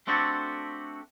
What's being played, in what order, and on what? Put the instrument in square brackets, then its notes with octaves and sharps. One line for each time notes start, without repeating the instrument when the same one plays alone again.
[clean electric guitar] A3 C4 D4 F#4 G4 A4